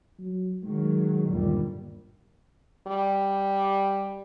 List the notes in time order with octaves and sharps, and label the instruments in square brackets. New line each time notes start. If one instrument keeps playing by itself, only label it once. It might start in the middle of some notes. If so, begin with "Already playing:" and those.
[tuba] F#3
[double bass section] D#3 F#3 [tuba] G#3
[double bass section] G1 D#2 G3 [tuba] A#2
[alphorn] G3